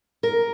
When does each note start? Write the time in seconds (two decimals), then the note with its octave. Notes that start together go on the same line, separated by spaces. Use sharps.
0.23 A#4